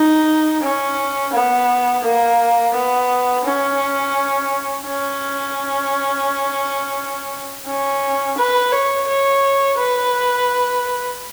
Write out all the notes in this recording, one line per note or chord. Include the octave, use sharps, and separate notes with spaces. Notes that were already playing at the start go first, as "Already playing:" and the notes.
Already playing: D#4
C#4
B3
A#3
B3
C#4
C#4
C#4
B4
C#5
C#5
B4